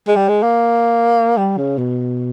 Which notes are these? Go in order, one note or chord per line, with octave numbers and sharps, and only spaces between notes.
G#3
G3
G#3
A#3
G3
C#3
B2